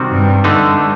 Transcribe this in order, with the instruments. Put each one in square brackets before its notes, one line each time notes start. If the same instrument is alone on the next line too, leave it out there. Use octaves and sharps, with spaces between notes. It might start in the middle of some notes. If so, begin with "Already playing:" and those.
Already playing: [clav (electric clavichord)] C3 D#3 G3 C4 F#4
[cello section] G2
[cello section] G2 [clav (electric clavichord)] D3 A3 D#4